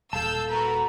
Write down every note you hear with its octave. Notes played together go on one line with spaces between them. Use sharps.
D#1 A4 F5 A5 E6 G6
F#4 A#4 B4 A#5